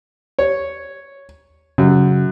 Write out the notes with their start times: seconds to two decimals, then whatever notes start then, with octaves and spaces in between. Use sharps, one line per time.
0.39 C#5
1.78 F#2 C#3